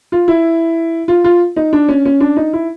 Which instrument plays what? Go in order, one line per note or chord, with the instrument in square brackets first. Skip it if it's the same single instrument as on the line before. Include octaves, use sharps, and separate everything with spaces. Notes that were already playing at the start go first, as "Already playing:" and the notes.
[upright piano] F4
E4
F4
F4
D#4
D4
C#4
C#4
D4
D#4
E4